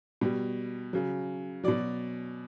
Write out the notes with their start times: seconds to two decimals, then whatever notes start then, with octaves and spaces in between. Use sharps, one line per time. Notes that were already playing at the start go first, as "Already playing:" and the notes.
0.21 B2 G3
0.93 C#3 F#3
1.64 B2 F#3 D5